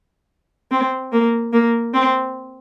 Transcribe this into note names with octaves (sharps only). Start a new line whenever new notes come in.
C4
A#3
A#3
C4